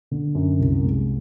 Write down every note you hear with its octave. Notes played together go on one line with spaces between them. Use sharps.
D3
F#2
C2
G#3